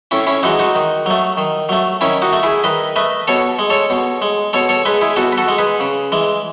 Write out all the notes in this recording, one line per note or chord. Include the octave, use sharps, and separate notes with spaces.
A2 C#4 E4
C#4 E4
E3 G#3 D#4 F#4
D#4 F#4
D#3
F#3 A3
D#3
F#3 A3
D#3 C#4 E4
D#4 F#4
A3
E4 G#4
D#3 B4 D#5
A3 B4 D#5
B2 A4 C#5
G#3
A4 C#5
B2
G#3
B2 A4 C#5
A4 C#5
G#3 G#4 B4
E4 G#4
B2 F#4 A4
B4
F#4 A4
G#3
G#4 B4
C#3
E3 G#3